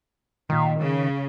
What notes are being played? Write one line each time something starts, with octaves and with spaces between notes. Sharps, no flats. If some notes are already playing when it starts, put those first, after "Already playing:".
A#2 D#3
C#3